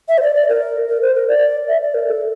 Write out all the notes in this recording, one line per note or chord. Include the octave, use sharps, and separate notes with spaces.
E5
C5
D5
D5
A#4
A#4
C5
A#4
D5
E5
D5
A#4
A4